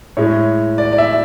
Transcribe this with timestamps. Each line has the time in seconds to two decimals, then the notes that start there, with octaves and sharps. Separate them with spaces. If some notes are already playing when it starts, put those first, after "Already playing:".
0.17 A2 G#3 C#5
0.78 D5
0.93 D5
0.98 E5